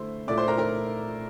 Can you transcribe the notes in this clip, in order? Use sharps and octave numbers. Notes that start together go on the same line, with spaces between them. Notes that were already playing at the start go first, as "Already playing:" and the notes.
Already playing: D3 A3 E4 C5 C6
A#2 A3 E4 D5 D6
C5 C6
A#4 A#5
A#4 A#5